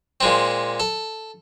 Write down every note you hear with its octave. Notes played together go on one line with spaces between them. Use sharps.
A#2 G#3 C4
A4